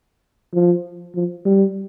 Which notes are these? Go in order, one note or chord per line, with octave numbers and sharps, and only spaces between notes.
F3
F3
G3